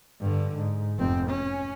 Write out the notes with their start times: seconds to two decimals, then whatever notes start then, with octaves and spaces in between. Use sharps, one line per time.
0.21 G2 D3
0.56 G#2
0.98 F1 C4
1.30 C#4